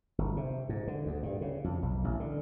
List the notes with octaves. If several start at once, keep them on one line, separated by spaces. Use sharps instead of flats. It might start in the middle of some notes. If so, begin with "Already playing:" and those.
G1
C3
G#2
D3
D2
G2
C#3
F2
B1
A1
D3